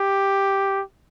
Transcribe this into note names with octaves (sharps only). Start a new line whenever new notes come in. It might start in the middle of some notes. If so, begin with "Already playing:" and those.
Already playing: G4